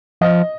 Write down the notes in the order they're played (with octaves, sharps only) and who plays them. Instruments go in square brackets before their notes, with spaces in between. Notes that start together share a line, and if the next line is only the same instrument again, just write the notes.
[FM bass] F3 [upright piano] D#5